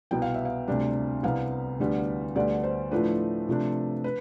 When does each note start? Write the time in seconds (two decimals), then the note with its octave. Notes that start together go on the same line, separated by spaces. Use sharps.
0.11 C2 B2 B3 G5
0.22 F5
0.34 E5
0.45 F5
0.68 D2 C3 G3 D4
1.23 C2 C3 G3 B3 F5
1.79 D2 D3 G3 B3 D4
2.36 D2 D3 G3 B3 D4 D5
2.63 C5
2.91 A2 F3 A3 D4 B4
3.49 C3 F3 A3 D4
4.04 B4